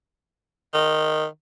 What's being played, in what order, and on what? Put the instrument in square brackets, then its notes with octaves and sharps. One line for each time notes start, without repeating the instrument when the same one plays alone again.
[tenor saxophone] D#3